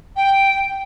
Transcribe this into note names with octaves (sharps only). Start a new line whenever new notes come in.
G5